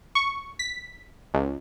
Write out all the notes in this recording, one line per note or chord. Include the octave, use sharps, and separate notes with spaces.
C#6
B6
C#2